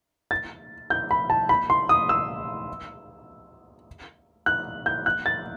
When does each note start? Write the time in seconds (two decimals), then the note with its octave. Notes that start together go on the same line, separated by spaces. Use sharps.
0.31 A6
0.90 G6
1.11 B5
1.30 A5
1.49 B5
1.70 C6
1.89 D#6
2.09 E6
4.46 F#6
4.86 G6
5.06 F#6
5.26 A6